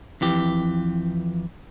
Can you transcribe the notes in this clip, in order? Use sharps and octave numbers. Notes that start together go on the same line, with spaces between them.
F2 E3 G4